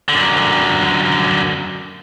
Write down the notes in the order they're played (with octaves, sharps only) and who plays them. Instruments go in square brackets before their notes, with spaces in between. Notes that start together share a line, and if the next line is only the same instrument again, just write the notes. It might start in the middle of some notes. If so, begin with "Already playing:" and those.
[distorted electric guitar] F#2 D3